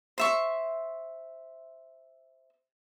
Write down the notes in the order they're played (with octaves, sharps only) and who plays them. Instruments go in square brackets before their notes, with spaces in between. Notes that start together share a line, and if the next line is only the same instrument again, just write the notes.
[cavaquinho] C5 E5 C#6